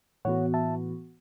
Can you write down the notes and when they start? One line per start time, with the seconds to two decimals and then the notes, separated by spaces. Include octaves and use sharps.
0.25 A2 E3 B3 F#4 C#5 F#5
0.54 E5 A5